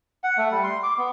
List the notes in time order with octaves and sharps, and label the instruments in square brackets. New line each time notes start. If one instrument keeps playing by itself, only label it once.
[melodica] F#5
A3
G3
C6
D6
B3